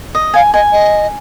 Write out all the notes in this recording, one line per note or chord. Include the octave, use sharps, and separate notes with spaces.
D#5
F5 G#5
D#5 G#5
D#5